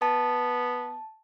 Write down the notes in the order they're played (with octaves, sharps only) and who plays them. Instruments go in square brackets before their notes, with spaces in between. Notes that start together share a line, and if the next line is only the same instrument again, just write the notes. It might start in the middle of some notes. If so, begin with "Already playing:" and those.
[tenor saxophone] B3 [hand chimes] A5